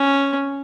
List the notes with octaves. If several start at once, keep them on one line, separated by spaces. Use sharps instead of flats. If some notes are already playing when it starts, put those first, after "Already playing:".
Already playing: C#4